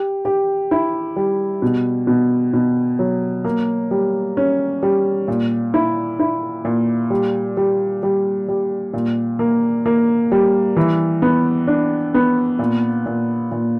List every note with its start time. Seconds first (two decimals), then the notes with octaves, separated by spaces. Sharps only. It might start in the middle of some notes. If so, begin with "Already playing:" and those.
Already playing: G4
0.25 G4
0.71 E4
1.16 G3
1.62 B2
2.07 B2
2.54 B2
2.99 F#3
3.44 A#3
3.91 G3
4.37 C#4
4.83 G3
5.28 A#2
5.74 E4
6.19 E4
6.65 A#2
7.10 G3
7.57 G3
8.03 G3
8.48 G3
8.93 A#2
9.39 A#3
9.86 A#3
10.31 G3
10.76 E3
11.22 B3
11.67 D4
12.14 B3
12.59 A#2
13.06 A#2
13.52 A#2